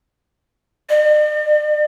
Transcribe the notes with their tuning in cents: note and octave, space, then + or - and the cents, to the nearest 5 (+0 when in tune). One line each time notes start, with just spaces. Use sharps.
D5 +45